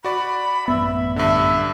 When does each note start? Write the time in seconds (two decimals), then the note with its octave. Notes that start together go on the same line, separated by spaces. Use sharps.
0.04 F#4 D5 B5
0.68 A1 F#2 B3 E5
1.16 G2 D3 E5